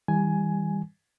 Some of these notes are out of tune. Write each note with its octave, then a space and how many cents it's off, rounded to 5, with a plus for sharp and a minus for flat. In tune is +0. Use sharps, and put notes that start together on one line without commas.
E3 -40 G3 +15 G#5 +10